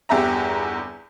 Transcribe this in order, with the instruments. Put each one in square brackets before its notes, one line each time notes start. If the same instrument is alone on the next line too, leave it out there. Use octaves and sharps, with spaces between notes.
[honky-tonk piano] G1 E2 G4 E5 A#5